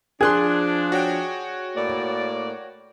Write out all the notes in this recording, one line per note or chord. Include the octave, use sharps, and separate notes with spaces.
F3 D4 G#4 C6 F#6 G#6
F#4 C#5 G5
A2 A#3 D5